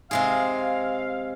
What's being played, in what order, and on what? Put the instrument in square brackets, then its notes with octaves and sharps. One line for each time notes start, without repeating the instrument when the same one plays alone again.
[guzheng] C3 G#3 G#4 [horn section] F5